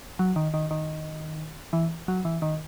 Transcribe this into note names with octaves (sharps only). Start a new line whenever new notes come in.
F#3
D#3
D#3
D#3
E3
F#3
E3
D#3